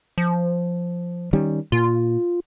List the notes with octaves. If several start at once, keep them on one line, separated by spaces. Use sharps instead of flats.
F3
D#3 G3 C#4
A#2 F4